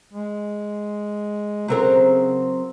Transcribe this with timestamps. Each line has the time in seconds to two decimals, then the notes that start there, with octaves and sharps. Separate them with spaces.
0.13 G#3
1.68 C#3 F#3 C4 A#4